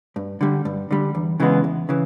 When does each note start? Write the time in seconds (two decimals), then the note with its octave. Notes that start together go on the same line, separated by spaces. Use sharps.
0.16 G2
0.41 D3 G3
0.65 G2
0.91 D3 G3
1.15 E2
1.40 C#3 E3 G#3 B3
1.64 E2
1.89 C#3 E3